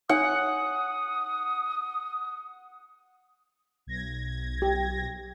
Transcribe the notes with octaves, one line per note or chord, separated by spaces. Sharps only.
D#4 C#5 F#5 G#5 D#6
B1 G#6 A#6
G4